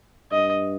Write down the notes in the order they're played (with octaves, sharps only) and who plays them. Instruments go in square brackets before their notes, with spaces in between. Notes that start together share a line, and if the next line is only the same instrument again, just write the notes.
[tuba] G2 [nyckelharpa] D#5